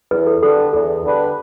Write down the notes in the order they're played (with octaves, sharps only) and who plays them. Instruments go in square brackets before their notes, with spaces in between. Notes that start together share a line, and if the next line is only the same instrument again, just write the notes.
[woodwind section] E2 [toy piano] B4
[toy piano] A4
[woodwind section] D3 G3 D4 B4 [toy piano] A4
[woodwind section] E2 [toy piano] A4
[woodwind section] D3 G3 D4 B4